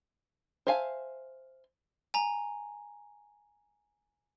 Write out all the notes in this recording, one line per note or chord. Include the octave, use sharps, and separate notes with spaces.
C5 E5 F5 G#5 A5
G#5 A#5